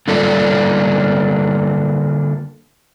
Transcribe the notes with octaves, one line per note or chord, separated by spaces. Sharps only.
D3 G3 A#3 D4 F4 A4